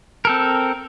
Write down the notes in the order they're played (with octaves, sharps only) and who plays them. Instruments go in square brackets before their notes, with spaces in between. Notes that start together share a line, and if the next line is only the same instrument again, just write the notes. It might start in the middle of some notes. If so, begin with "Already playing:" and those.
[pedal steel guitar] C4 A4 A#4